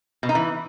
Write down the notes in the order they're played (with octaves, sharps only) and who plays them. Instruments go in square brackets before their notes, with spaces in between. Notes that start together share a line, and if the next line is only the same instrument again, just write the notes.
[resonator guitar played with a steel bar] B2
D#4
E3